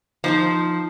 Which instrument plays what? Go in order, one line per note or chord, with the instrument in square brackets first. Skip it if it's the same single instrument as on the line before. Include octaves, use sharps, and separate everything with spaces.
[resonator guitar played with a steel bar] F3 [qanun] D#4 C5 A5